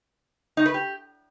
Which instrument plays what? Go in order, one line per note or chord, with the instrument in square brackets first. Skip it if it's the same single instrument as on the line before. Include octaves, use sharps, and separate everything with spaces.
[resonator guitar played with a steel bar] D#4
B4
G4